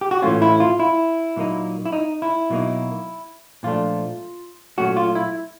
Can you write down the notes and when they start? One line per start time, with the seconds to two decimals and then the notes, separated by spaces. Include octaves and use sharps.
0.01 G4
0.11 F#4
0.22 A2 E3 A3 C#4 F4
0.42 E4
0.60 F4
0.79 E4
1.36 A#2 F#3 A#3 D#4
1.86 E4
1.92 D#4
2.22 E4
2.50 B2 F#3 A#3 D#4
3.63 A#2 F3 A3 D4 F4
4.78 A#2 F#3 A3 C#4 F#4
4.97 F4
5.15 E4